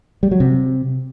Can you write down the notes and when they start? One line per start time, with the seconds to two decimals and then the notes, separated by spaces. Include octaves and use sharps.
0.23 G3
0.31 F#3
0.40 C3